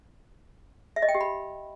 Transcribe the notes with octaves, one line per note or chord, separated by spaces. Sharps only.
E5
D#5
G5
G4
B5